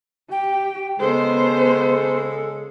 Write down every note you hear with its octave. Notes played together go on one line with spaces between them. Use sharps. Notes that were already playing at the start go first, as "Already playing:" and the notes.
G4 G5
C#3 G#3 B3 A4 C5